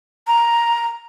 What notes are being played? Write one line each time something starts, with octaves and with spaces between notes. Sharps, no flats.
A#5